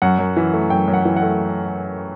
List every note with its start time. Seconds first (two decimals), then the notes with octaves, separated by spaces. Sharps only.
0.02 F#2 F#5
0.19 F#2
0.37 E3
0.53 A3
0.70 F#2 G5
0.88 F#2
0.93 F#5
1.05 E3
1.16 F#5
1.22 A3